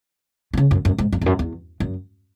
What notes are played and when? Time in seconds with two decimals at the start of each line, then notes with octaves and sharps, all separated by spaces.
0.53 B2
0.57 C#3
0.71 F#2
0.85 F#2
0.98 G#2
1.12 F#2
1.21 E2
1.26 F#2
1.39 E2
1.80 F#2